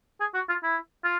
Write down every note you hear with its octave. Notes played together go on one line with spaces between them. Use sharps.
G#4
F#4
F4
E4
F4